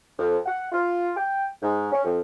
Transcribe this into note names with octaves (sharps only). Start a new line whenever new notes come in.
F2
F#5
F4
G5
G#2
C#4
F2